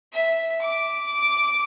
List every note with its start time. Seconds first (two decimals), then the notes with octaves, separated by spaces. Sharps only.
0.13 E5
0.62 D6
1.07 D6